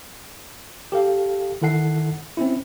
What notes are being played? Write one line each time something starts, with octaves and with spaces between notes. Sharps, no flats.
G4 A4 F5
D#3 E4 A4 F#5 C7
C4 C#4 E4